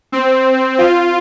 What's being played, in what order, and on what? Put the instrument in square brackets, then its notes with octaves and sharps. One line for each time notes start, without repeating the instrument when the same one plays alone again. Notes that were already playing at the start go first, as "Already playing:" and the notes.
[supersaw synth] C4
F4